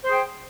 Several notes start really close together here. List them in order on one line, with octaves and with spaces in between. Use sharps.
C5 G#4 G5